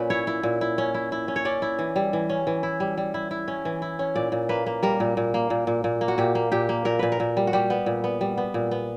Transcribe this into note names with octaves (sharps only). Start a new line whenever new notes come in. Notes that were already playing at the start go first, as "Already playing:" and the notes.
Already playing: A#2 C#4 B4
E4 C#5
E4
A#2
E4
C#4
E4
E4
C#4
C#5
C#4 D5
E4
E3
G3
E3
C#4
E3
E4
G3
G3
E4
E4
C#4
E3
E4
C#4
A#2 D5
A#2
A#3 B4
A#3
G3 A#4
A#2
A#2
A#3
A#2
A#2
A#2
A#3
F#4
A#2 G4
A#3
A#2 G4
A#3
A#2 A#4
A#2 B4
A#4
A#2
G3
F#4
G3 G4
B3
A#2
B3
G3
B3
A#2
B3